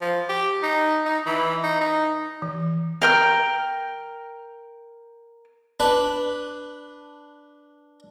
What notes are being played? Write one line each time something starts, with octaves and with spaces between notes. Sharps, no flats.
F3
G4
D#4
D#4
E3
D#4
D#4
E3
A#4 G5 F6
D4 B4